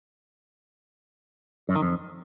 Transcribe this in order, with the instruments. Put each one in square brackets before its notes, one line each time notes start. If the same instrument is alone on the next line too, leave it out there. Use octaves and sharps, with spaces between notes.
[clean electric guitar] F#2
D#3
F2